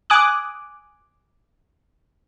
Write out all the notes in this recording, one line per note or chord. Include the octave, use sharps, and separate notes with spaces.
G#5 D6 D#6 F#6